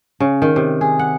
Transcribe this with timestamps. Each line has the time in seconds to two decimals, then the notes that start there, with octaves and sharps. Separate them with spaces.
0.20 C#3
0.42 D#3
0.56 C3
0.81 G#4
0.99 F#5